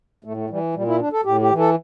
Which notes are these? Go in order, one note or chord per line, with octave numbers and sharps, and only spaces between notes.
A2 A3
A3
E3 G3
A#2 G3
E4
D4
A4
A2 G4
G4
E3
A4